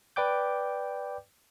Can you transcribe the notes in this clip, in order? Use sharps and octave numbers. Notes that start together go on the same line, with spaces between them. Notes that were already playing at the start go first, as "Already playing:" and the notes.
B4 D5 G5 D6 G6